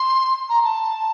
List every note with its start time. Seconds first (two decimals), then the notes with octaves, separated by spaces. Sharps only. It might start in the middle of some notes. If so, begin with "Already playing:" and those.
Already playing: C6
0.49 A#5
0.64 A5